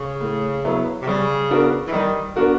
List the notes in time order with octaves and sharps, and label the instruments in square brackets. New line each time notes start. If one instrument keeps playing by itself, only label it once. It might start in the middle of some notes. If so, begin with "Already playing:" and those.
Already playing: [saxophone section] C#3
[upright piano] A2
F#3 B3 E4
[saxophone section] C3
[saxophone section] C#3 [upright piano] G3
[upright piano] B3 D4 F#4 A#4
[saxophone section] E3
[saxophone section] D#3 [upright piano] G3
[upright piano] B3 D4 F#4 A#4